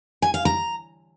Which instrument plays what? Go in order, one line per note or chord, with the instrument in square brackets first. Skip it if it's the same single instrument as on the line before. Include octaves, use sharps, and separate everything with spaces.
[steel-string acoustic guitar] G#5
F5
A#5